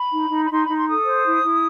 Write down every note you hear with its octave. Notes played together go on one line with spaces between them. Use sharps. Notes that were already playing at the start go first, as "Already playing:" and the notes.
Already playing: B5
D#4
D#4
B5
D#4 C6
B5
D#4
C6
A4 D#6
C5
E4
E4